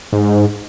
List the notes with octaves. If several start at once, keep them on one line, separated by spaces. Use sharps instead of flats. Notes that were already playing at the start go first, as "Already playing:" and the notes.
G#2